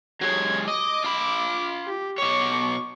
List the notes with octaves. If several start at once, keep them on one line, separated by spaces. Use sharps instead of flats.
F#3 G#3 C#5 G#6
D#5 D6
F4 B5
G4
B2 C#5 C#6 D6